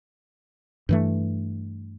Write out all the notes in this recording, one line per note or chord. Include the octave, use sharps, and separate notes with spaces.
G2 E3 A3